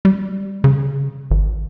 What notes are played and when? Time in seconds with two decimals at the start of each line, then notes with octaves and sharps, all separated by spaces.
0.05 G3
0.64 C#3
1.31 G#1